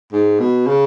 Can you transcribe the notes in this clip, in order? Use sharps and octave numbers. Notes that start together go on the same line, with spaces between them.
G#2
B2
C#3